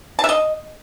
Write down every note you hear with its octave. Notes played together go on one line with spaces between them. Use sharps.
A5
E5
D#5